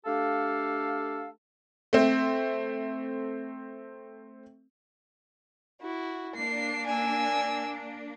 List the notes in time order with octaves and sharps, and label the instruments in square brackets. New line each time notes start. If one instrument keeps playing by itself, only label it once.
[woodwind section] A3 D4 G4 A4 F5
[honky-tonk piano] A3 C4
[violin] E4 F#4
[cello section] A#3 D4 [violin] C7
[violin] G#5 E6